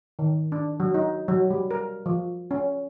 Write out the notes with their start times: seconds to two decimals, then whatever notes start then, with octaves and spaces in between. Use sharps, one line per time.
0.19 D#3
0.52 D4
0.80 F#3
0.94 D#4
1.28 F#3
1.50 G3
1.71 A#4
2.06 F3
2.51 C#4